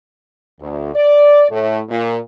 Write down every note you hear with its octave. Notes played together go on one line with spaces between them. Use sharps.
D2
D5
A2
A#2